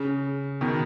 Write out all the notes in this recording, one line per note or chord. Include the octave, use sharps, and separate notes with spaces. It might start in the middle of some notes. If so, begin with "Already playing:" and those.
Already playing: C#3
B2 D#3